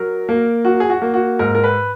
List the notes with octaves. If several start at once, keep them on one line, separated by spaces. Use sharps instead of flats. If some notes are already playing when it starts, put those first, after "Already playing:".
Already playing: F#3 A#4
A#3
F#3 F#4
G#4
F#4
A#3
F#4
G#2 A#4
A#4
B4